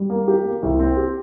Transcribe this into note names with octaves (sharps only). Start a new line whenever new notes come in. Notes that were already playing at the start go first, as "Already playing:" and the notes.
Already playing: G3
A#3
G4
A#3
C2
C4
G4